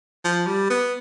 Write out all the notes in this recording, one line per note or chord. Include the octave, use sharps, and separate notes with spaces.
F3
G3
B3